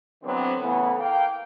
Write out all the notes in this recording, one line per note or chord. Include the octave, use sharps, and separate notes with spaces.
D3 E3 F#3 B3 C4
C#3 E3 A3 B3
A#3 F5 G5